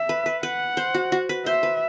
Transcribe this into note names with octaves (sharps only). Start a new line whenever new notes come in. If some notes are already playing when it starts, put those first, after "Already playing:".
Already playing: E5
B4
B4
B4 F#5
C5
F#4
F#4
B4
C5 E5
B4